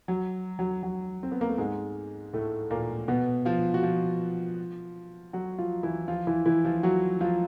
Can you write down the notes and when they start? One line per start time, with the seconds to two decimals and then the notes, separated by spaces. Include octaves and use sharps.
0.08 F#3
0.59 F#3
0.83 F#3
1.23 C4
1.32 B3
1.41 A#3
1.49 A3
1.58 G#2 G#3
2.33 A2 A3
2.71 A#2 A#3
3.08 B2 B3
3.45 F3 F4
3.74 F#4
3.83 F3 F4
5.33 F#3 F#4
5.59 F3 F4
5.83 E3 E4
6.08 F3 F4
6.27 E3 E4
6.46 E3 E4
6.65 F3 F4
6.83 F#3 F#4
7.20 F3 F4